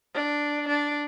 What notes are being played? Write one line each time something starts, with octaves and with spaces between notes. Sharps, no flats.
D4
D4